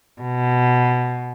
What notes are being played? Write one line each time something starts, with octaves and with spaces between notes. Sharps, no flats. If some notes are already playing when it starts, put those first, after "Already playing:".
B2